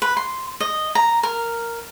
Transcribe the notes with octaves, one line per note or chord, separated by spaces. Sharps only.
B4
C6
D#5
A#5
A#4